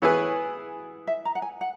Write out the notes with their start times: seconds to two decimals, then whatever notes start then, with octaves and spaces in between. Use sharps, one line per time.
0.02 E3 B3 E4 G#4 B4 C#5
1.07 E5
1.25 A#5
1.35 F#5
1.42 G#5
1.61 F#5